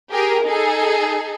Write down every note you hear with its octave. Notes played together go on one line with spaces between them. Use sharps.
G4 G#4 A#4
D#4 G#4 A4